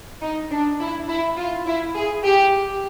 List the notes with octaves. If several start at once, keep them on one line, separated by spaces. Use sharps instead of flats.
D#4
D4
E4
E4
F4
E4
G#4
G4